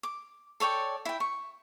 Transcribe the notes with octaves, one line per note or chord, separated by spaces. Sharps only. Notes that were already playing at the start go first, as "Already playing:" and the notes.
D6
A4 C#5 D5 G5
E4 G5
C#6